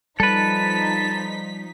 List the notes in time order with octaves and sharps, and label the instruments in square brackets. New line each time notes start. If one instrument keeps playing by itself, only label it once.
[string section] F3 D#4 B6 [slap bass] G3 [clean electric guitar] A4 B4 [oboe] A5